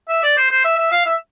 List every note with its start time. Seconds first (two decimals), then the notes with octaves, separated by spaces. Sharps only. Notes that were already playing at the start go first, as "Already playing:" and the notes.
0.09 E5
0.23 D5
0.37 C5
0.51 C5
0.64 E5
0.78 E5
0.92 F5
1.05 E5